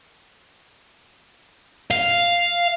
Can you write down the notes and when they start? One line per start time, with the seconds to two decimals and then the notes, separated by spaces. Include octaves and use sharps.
1.91 F5